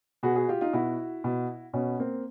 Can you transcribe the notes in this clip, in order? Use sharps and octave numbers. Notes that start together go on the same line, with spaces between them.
B2 F#4 G#4
F#4 G#4
F4 G4
D#4 F4
B2 E4 F#4
B2
B2 B3 C#4
A#3 C4